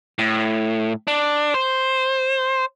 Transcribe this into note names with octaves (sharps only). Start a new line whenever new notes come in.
A2
D4
C5